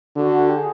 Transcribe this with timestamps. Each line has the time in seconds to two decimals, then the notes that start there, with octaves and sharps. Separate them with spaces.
0.16 D3 F#4
0.49 G4
0.58 G#4